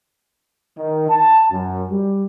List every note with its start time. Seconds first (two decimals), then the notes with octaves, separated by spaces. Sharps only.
0.78 D#3
1.09 A5
1.51 F#2
1.91 G3